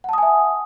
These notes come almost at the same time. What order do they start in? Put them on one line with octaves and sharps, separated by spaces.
F#5 A5 D#6 G#5 E5